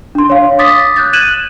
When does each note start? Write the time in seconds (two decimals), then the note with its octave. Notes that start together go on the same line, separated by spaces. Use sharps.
0.15 D4 C6
0.30 C#5 F5
0.59 D6 D#6 A6 B6
0.96 F#6 G6 A6
1.13 F#6 G#6 D#7 E7 F#7